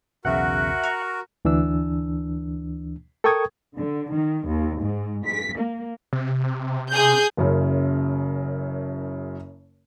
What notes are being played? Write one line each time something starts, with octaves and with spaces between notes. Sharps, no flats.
B1 E2 C#3 F#4 A#4 E5 F#5
A#5 C#6
D2 E3 D4 E6
A4 A#4 G5 C#6 D#6 G#6
D3
D#3
D#2
G#2
B6
A#3
C3
G#4 G6
F#1 F#2 C#3